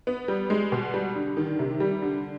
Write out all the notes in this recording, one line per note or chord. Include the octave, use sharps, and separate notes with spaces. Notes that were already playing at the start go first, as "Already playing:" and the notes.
B3
G3
G#3
B2
G3
D3
D#3
C3
G3
D3